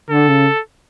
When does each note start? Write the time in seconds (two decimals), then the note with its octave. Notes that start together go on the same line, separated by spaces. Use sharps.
0.10 D3 A4
0.28 C#3